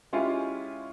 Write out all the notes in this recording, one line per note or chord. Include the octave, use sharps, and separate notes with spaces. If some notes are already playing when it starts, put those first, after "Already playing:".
G#3 C#4 E4 F4 G4